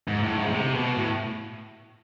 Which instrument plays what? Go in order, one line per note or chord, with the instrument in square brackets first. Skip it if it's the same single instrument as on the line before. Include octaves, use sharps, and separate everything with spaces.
[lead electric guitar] G#2
A2
G#2
C#3
C3
B2
A2